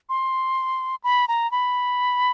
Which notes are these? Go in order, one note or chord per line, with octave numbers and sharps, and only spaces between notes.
C6
B5
A#5
B5